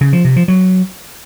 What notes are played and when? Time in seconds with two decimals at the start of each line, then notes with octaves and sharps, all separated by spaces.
0.01 C#3
0.13 F3
0.25 C3
0.36 F3
0.48 F#3